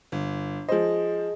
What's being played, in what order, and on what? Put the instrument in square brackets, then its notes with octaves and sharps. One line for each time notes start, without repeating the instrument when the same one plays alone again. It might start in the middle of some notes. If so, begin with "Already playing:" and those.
[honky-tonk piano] G1
[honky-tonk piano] F3 C5 [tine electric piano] G#4 D#5